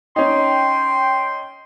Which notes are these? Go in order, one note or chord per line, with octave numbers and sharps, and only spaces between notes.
C#4 D#4 G5 C6